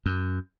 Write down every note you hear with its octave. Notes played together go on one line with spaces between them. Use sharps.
F#2